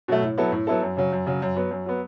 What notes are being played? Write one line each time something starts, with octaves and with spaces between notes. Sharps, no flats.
B2 F#3 A3
A2
F#3 B3 E4 A4
A2
F#3 B3 E4 A4
F#2
C#3 F#3
F#2
C#3 F#3
F#2
F#3 B3
F#2
F#3 B3